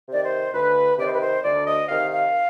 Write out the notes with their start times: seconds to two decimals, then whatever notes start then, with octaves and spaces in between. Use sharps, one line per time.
0.08 C3 D#3 D5
0.24 C5
0.54 D2 B4
0.98 C3 D#3 D5
1.06 C5
1.14 B4
1.21 C5
1.44 D2 D5
1.67 D#5
1.89 C3 D#3 F5
2.12 F5